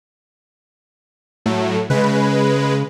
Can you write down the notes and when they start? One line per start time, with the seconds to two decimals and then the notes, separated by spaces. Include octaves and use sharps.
1.46 A2 F#3 A3
1.90 C#3 G#3 B4